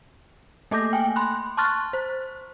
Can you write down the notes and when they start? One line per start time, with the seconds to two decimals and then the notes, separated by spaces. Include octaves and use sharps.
0.71 A3 A#3 A4 D6 G6 A#6
0.93 G5 G#5
1.16 B5 C6 F#6
1.57 A5 C6 C#6 F6 F#6 A6
1.93 C5